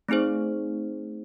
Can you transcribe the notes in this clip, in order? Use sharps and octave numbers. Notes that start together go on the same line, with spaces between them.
A3 C4 D#4 G#4 C5